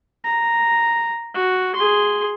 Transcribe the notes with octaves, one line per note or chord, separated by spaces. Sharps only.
A#5
F#4
G#4 C6